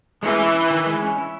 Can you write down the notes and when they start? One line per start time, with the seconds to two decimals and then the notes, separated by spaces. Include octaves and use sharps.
0.23 E3 G#3
0.38 C#4
0.55 E4
0.70 D#3
0.86 G#3
1.02 C#4
1.18 E4